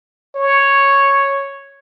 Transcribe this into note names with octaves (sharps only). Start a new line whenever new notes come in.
C#5